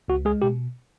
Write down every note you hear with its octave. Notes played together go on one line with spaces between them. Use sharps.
C#2 F#4
G#3 G#4
B2 G4